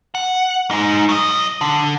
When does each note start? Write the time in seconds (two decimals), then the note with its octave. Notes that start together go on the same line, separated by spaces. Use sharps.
0.15 F#5
0.71 G#2 D#4
1.09 F#3 D#5
1.61 D3